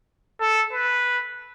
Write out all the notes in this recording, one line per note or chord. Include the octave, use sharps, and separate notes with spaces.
A4
B4